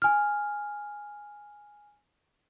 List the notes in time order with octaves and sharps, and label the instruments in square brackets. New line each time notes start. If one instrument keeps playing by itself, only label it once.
[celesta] G#5 F6